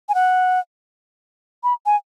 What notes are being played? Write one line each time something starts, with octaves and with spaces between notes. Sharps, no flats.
G#5
F#5
B5
G#5